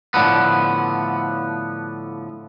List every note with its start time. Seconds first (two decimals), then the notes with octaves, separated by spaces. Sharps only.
0.14 A2 D3 F3 B3